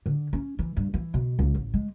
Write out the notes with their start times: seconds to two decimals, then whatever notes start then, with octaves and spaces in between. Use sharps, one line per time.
0.06 D3
0.33 C#4
0.59 E3
0.77 G2
0.94 E3
1.14 B2
1.39 C#2
1.55 A1
1.74 G#3